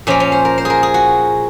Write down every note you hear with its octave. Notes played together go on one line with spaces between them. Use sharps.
A#2 F3 A#3 C#4
C#4
C5
A#4
C5
G#4 A#4
G#4
F#4